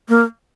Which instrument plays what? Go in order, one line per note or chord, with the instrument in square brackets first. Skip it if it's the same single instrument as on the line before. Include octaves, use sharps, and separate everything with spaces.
[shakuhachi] A#3